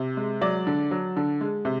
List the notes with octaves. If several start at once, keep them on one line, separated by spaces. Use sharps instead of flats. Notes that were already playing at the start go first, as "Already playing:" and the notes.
Already playing: C3
G#3
F#3 D5
D3
F#3
D3
G#3
C3